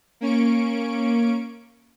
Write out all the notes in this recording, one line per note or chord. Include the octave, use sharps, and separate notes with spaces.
A#3 C#4 C#6 D7